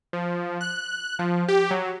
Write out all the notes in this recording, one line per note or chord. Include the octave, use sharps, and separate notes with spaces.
F3
F#6
F3
G4
F#3